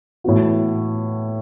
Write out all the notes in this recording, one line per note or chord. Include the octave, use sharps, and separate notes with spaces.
A2 E3 B3 F#4